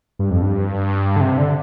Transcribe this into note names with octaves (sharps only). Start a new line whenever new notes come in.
G2
F2
G2
D3
C3
D3